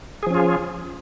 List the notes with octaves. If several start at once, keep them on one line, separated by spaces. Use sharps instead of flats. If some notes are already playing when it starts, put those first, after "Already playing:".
F3 C#4 F4 G#4